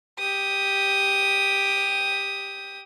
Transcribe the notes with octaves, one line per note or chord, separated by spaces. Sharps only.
G4 D#6